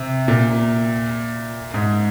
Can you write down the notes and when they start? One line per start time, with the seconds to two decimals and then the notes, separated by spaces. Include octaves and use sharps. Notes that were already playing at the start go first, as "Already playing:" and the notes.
Already playing: C3
0.28 A#2
1.74 G#2